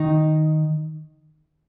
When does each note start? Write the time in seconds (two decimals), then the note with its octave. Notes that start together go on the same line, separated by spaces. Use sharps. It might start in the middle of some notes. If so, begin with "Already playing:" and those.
Already playing: D#3 D#4